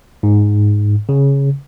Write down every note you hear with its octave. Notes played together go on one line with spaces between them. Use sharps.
G#2
C#3